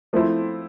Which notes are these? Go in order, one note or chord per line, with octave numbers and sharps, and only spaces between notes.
F3 A3 C4 E4